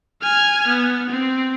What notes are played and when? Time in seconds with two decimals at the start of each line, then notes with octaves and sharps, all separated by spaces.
0.23 G#5 F6
0.67 B3
1.10 C4